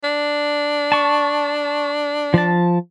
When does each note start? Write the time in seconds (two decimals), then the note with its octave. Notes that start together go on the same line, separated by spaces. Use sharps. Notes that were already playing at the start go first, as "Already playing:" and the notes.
0.04 D4
0.92 A5 C#6
2.34 F3 A5